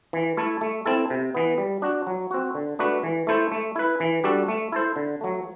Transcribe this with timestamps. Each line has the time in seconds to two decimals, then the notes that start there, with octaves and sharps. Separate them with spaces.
0.13 E3
0.37 A3 E4 A4
0.61 A3
0.86 C4 E4 A4
1.10 C3
1.35 E3 B3
1.58 G3
1.82 D4 F#4
2.07 F#3
2.31 C4 F#4
2.55 D3
2.79 A3 D4 F#4 B4
3.03 E3
3.27 A3 E4 A4 C5
3.52 A3
3.76 E4 B4
4.00 E3
4.24 G3 D4 F#4 A4
4.48 A3
4.72 E4 A4 C5
4.96 D3
5.21 F#3 A3